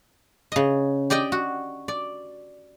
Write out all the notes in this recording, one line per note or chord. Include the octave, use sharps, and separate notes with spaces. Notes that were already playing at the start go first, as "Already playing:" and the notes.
C#3 D#5
G4 D5 D#5 G5
F#4
D5